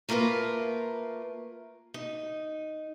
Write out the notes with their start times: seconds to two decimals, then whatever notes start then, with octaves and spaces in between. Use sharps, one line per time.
0.09 A3 A#3 F4 A#4 B4
1.94 D#4